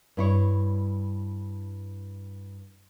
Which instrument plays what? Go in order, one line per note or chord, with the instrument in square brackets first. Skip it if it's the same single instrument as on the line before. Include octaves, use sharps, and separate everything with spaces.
[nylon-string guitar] G2 E4 C#5